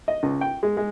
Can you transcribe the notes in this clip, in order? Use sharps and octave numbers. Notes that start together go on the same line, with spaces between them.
D#5
C#2
G5
G#3
G#3